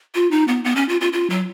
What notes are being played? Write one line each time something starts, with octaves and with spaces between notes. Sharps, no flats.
F4
D#4
B3
B3
C#4
F4
F4
F4
F#3